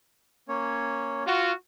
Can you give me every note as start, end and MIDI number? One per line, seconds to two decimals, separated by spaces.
0.48 1.24 58
0.48 1.24 61
0.48 1.24 73
1.26 1.53 65
1.26 1.53 66